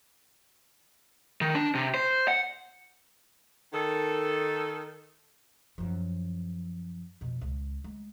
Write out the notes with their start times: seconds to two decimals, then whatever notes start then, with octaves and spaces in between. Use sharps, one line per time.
1.41 D#3
1.55 D4
1.75 C3
1.94 C5
2.28 F#5
3.73 D#3 A4
5.78 F#2 F3
7.21 F2 B2
7.41 C#2
7.84 G#3